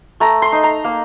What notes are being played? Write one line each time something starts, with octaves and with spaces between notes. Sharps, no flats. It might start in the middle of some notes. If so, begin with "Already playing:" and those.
A3 A#5
C6
D#4
A#5
A#3